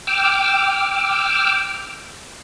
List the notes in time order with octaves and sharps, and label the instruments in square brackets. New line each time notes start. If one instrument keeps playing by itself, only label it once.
[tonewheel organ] G5 D6 E6 F6